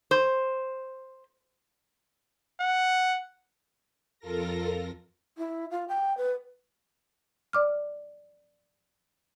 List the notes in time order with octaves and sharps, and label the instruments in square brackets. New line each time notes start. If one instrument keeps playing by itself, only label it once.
[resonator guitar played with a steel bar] C5
[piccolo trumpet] F#5
[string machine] F2 F4 A4 A#4 A#6
[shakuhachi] E4
F4
G5
B4
[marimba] D5 D6 F6